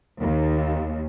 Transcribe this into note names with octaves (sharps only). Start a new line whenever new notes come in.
D#2